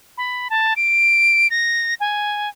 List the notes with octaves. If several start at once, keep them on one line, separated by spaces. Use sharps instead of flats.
B5
A5
D7
A#6
G#5